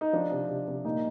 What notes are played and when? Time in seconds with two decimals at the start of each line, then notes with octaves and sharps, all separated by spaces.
0.01 D#4
0.13 F3 D4
0.31 C3
0.49 C3
0.67 C3
0.85 A#2 D#4